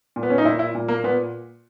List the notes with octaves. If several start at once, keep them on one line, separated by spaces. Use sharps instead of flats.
A#2
B3
C#4
D#4
A#2 E4
E4
A#2
A#3
A#2 B3